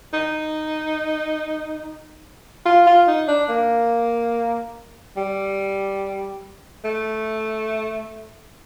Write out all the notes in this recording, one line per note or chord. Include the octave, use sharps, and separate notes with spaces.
D#4
F4
F4
D#4
D4
A#3
G3
A3